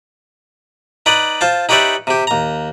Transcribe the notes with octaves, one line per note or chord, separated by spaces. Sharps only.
D#4 B4 D5
F4 C5 A5
D#4 G4 B4 C#5 D5 E5
C3 G4
D#2 A#5